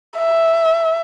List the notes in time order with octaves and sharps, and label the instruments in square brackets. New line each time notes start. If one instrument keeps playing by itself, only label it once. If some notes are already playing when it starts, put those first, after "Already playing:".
[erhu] E5